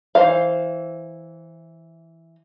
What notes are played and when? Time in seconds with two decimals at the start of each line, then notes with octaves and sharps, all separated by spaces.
0.15 E3 C5 F5